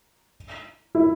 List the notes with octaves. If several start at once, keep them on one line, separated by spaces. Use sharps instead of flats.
E4